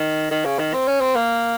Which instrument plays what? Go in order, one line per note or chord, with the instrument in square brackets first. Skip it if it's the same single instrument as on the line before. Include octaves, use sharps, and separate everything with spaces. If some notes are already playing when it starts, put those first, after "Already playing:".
Already playing: [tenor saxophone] D#3
D#3
C#3
D#3
C4
C#4
C4
A#3